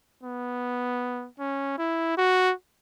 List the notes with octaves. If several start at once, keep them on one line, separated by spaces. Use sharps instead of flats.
B3
C#4
E4
F#4